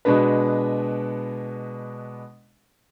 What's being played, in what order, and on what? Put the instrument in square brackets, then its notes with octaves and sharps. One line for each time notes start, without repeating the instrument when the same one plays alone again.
[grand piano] B2 G#3 B3 D4 B4